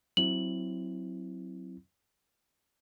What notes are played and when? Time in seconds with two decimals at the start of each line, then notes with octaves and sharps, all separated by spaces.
0.17 F#3 C4 E4 F#7